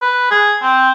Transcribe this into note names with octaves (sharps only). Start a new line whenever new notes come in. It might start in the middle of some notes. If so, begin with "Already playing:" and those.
B4
G#4
C4